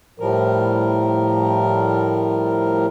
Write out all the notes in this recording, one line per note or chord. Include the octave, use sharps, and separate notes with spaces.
A2 F3 G3 A#4